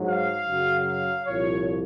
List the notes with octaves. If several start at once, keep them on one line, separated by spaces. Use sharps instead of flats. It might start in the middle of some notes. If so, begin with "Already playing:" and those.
Already playing: G#2 F#3
F5
F#2 C#3 F#3
F5
C2 A#2 F3 C#5